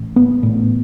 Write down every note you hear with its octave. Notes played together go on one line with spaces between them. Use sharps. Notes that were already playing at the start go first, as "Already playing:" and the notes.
Already playing: A1 A2
B3
A1 A2